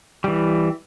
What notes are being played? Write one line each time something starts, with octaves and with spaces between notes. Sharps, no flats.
E3 G3